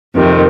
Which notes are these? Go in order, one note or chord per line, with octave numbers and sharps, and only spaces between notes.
F2 C3 D#3